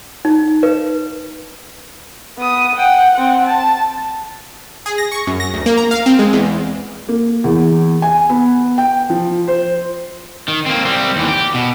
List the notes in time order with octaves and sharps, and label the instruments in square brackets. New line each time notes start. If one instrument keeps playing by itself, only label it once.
[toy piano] D#4
B4
[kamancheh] B3 D#6
F#5 G5
C4 F#5
A5
[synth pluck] G#4
A#6
C#6
F#2
A#6
D2
A#3
A#5
F5
C4
G#3
E2
[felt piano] A#3
E2
G#5
B3
G5
F3
C5
[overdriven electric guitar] D#3
A#3 C4
G3 C4
D#2 E3
G4
B2